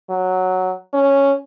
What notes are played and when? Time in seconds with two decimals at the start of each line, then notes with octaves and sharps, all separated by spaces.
0.10 F#3
0.94 C#4